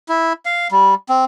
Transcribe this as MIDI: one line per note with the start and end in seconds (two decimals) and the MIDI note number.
0.09 0.33 64
0.46 0.68 77
0.72 0.95 55
1.09 1.25 60